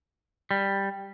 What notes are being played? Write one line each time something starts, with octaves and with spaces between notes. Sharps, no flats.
G3